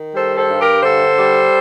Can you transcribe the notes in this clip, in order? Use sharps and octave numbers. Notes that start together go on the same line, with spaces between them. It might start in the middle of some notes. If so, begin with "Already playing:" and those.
Already playing: D#3
G3 A4 C5
A4 C5
G2
G4 A#4
D3 A4 C5
G3